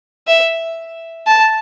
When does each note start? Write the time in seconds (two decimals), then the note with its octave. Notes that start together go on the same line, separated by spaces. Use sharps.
0.27 E5
1.27 A5